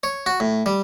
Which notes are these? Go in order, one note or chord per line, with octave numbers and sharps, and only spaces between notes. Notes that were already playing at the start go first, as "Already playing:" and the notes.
C#5
F#4
A2
G3